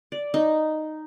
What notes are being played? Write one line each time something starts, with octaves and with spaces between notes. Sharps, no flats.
D5
D#4